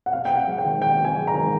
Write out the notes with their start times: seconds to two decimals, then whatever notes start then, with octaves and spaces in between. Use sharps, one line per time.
0.06 F#5
0.12 C3 F5
0.25 C3 G5
0.35 F#5
0.47 G#3
0.58 G5
0.64 D#3
0.81 C3 G5
0.99 C3
1.05 G#5
1.16 G#3
1.27 A#5
1.34 D#3